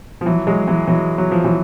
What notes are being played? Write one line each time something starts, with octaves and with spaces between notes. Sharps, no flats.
F3
E3 F#3
F#3 G#3
E3 F#3
E3 F#3
F#3
F3
E3 F#3